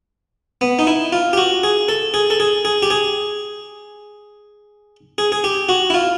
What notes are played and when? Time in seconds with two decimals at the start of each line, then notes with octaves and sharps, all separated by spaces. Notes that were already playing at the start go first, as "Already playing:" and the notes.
0.61 B3
0.79 D#4
0.87 E4
1.13 F4
1.33 G4
1.37 F#4
1.63 G#4
1.89 A4
2.14 G#4
2.30 A4
2.40 G#4
2.65 G#4
2.83 G4
2.90 G#4
5.18 G#4
5.32 G#4
5.44 G4
5.69 F#4
5.90 E4
5.94 F4